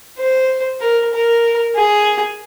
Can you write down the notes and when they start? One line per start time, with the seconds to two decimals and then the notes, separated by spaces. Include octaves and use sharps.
0.19 C5
0.81 A#4
1.13 A#4
1.75 G#4